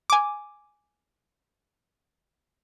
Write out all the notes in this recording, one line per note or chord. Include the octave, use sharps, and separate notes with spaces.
G#5 D6